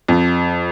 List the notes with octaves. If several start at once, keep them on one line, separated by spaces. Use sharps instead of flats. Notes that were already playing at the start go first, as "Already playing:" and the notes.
F2